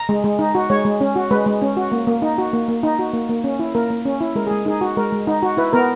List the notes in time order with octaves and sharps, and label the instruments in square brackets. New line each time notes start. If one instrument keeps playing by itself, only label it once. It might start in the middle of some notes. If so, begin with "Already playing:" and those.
Already playing: [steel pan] A#5
G#3
G#3
D#4
F#4
G#3 C#5
G#3
C#4
F#4
G#3 B4
G#3
C#4
F#4
A#3
A#3
D#4
F#4
A#3
A#3
D#4
F#4
A#3
A#3
C#4
E4
A#3 A#4
A#3
C#4
E4
G#3 A#4
G#3 G#4
D#4 G#4
F#4
G#3 A#4
G#3
D#4
F#4
E4 B4
B3 A#4